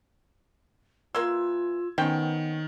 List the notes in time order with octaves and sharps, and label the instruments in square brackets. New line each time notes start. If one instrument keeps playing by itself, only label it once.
[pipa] E3 A#3 C6 [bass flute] F4 [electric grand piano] E6 G#6
[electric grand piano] D#3 [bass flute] B3 [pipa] C#4 C5 G5